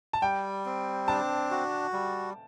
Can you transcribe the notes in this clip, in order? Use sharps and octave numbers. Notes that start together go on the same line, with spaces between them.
A5
G3 G5
C4
D4 A5
F#4
G3